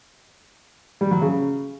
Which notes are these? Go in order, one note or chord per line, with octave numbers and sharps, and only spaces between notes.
G3
F#3
C#3